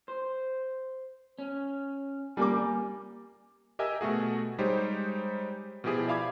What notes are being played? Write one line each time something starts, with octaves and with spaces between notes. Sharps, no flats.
C5
C#4
G3 A#3 G#5 D6
G4 A#4 D#5 E5 G#5 E6
B2 A3 F#4 G#4
G3 G#3 D#4 G4 C5 C#5
B2 F3 E4 G4 G#4
D5 E5 F5 B5 D6 G#6